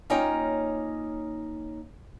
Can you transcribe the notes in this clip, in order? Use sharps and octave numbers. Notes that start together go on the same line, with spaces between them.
A#3 C#4 D#4 F4 C#5 G5